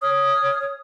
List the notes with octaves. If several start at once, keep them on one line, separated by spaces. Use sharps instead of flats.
C#5 D#6 F6